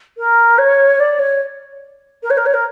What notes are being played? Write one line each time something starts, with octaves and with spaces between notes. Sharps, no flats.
A#4
C#5
D5
C#5
A#4
C#5
A#4
C#5
A#4